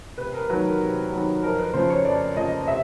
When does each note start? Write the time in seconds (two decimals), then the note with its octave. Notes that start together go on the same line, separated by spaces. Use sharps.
0.18 C3 B4
0.34 A#4
0.49 D#3 F#3 B3 B4
0.65 A#4
0.80 C3
1.12 D#3 F#3 B3
1.43 F2 A#4
1.59 B4
1.74 C#3 F3 C5
1.90 C#5
2.05 F2 D5
2.36 C#3 F3 D#5
2.68 C3 E5